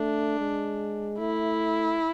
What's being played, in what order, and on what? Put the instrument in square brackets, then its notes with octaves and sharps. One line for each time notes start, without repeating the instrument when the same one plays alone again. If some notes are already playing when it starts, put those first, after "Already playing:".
Already playing: [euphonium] A3 [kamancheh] D4
[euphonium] G#3
[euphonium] A3 [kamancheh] E4